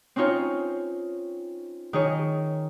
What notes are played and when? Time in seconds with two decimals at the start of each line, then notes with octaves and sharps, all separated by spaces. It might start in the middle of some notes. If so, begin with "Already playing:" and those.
0.16 C4 C#4 D#4 F4 C#5
1.93 D#3 G#4 C#5